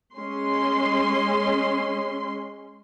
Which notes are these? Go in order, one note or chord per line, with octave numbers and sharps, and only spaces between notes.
G#3 C#4 C6